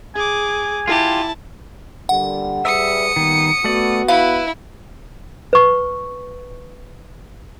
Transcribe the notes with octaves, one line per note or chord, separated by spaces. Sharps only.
G#4 G#5 D6
E4 F4 G4 A5
A#2 D3 G3 F#5
G3 G#4 B4 E5 D#6 C#7
A#2 D#3 G3 B3
A3 B3 F#4 D5
E4 B4 F5
B4 C#6